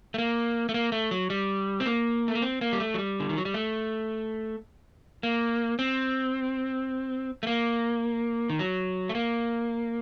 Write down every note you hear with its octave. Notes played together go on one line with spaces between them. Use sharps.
A3
A#3
A3
A#3
A3
F#3
G3
C4
A#3
A3
A#3
C4
A#3
G3
A3
F#3
G3
D3
D#3
F#3
G3
A3
A#3
C4
A3
A#3
D#3
F#3
A3
A#3